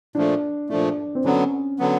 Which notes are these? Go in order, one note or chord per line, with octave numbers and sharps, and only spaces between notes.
A#2 F3 A3 D4
A#2 F3 A3 D4
C4
D3 F#3 B3 C#4
D3 F#3 B3